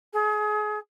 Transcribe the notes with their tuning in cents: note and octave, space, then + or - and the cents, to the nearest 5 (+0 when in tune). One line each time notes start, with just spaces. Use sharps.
G#4 +30